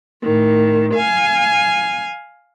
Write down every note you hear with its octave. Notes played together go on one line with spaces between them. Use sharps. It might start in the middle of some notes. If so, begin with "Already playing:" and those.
A2 D#3
F5 G#5